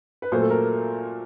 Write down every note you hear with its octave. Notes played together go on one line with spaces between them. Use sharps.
B4
A#2 F#3 A3 C5
A4
A#4